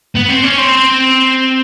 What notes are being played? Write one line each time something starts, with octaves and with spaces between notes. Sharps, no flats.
B3
C4
C#4
C4